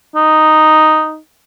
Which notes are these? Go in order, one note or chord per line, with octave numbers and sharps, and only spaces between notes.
D#4